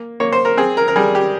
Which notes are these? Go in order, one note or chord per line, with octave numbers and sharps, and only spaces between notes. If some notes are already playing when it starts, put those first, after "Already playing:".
Already playing: A#3
A#3 C#5
C5
A#4
C4 G#4
A#4
A#4
G3 G#4
G4